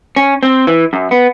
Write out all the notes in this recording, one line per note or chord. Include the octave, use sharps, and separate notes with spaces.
C#4
C4
E3
F#2
B3